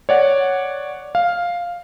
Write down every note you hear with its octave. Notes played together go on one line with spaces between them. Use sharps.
C#5 D5 F#5
F5